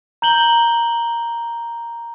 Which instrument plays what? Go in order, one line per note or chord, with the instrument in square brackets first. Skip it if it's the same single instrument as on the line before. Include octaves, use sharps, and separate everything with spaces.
[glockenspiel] A#5 G6 F#7 G7